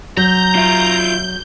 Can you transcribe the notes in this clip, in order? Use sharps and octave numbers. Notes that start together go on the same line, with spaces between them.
F#3 A#5 G6
F4 E5